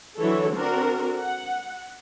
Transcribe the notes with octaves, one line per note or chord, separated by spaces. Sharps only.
D3 E3 F#3 E4 A4 C#5
C4 D4 F#4 A4 A#4
F#5